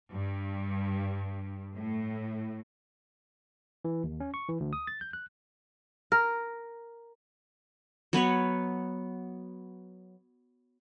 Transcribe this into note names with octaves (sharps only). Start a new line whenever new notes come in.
G2
A2
E3
D#2
C#4
C#6
E3
D2
D#6
A6
G6
F#6
A#4
F#3 B3 B4 C#5